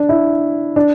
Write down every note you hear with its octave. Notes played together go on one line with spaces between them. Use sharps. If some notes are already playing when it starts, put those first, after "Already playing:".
Already playing: D4
E4
D4